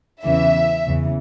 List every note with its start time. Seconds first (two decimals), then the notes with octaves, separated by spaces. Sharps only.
0.24 E2 C#3 E3 E5
0.86 E2 C#3 E3